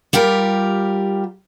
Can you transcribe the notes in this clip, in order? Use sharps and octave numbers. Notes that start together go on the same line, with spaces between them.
G3 F4 G4 A#4